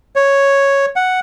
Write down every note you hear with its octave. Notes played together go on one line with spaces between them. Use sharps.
C#5
F#5